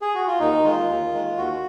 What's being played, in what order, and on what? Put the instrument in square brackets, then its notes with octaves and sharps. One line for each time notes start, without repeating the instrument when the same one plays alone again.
[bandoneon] G#4
F#4
F4
D#2 D#4
D#3 G#3 F4
D#2
D#3 G#3
D#2 F#4